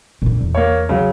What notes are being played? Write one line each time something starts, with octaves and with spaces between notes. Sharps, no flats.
A#2 D3
E2
A#3 C#5
C#3 F#3